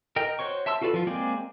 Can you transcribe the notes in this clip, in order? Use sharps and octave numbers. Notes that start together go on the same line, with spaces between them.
A#4 D#5 G5
F#4 C5 C#5 C#6
E5 A5 C6 E6
F4 F#4 A4 B4 D5
F3 F4
G#3 A#3 C4 G#4 D5